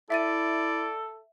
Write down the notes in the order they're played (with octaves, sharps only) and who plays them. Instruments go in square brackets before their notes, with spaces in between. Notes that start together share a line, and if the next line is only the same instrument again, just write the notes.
[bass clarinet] E4 [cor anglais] A4 [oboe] D5 [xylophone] E5 A6 D#7